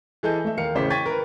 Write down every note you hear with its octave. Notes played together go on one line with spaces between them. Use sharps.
E3 G#4 A4 D#5 G6
A3 E5
D#2 A#4 F5 C#7
A1 C#3 C5 D6 B6
G5 C#6 G#6 A6 B6 D#7
A#4 B4